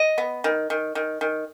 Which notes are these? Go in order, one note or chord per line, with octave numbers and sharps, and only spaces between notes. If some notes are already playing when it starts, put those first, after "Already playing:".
Already playing: D#5
B3
D#3
D#3
D#3
D#3